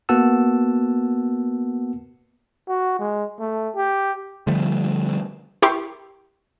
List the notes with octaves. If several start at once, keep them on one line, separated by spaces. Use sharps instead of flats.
A#3 B3 F#4 F#5 A5 E6
F#4
G#3
A3
G4
D3 F3 G3 A3
E4 G4 A#4 C6 C#6